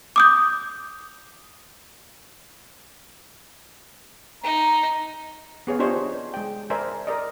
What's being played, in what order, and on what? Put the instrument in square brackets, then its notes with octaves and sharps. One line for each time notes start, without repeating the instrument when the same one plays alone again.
[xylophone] D6 D#6 G6
[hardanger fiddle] D#4 [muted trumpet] A#5
[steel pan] B3 G#4 C#5 F5
D4 F4 G4 C5 C#5 D#5
G#3 G5
A#4 C5 D5 E5 G#5
A#4 D5 D#5